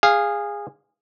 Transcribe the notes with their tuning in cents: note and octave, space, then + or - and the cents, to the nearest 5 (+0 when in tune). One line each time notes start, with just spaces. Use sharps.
G#4 -20 F5 +0